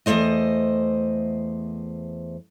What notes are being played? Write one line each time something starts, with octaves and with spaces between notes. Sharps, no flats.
E2 C3 A3 C5 D#5